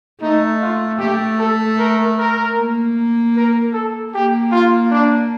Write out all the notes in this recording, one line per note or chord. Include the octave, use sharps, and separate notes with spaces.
A3 D#4
F4
A3 G4
A4
A#4
A#4
A#3
A#4
A4
A#3 G4
F4
D4